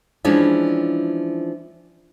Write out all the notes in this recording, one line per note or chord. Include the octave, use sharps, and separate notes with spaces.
E3 F3 G#3 C#4 D4 E4